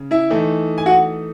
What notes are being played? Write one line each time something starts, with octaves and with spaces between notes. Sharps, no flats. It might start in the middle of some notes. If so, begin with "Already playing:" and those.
Already playing: C#3
E4 E5
E3 A3 D#4
G#5
F#4 F#5